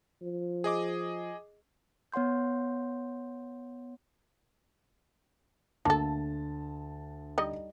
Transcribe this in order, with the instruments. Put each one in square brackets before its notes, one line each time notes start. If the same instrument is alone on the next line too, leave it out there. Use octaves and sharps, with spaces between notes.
[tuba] F3
[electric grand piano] G#4 D#5 D6
[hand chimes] B3 C#5 F#5 C6 G6
[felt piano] D2 A5 [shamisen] A#3 A4
[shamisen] G3 D#4 D#5